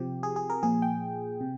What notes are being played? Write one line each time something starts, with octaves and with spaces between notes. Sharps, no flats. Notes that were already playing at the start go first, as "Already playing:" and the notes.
Already playing: C3 F3 G4
G#4
G#4
A#4
A#2 F3 G#4
G5
C3